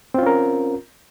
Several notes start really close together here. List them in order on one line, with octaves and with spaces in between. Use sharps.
C4 F4 C#4 A#4